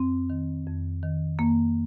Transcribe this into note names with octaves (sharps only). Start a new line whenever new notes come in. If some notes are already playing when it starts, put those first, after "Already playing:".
Already playing: F2 C4
D#3
F2
D#3
F2 A#3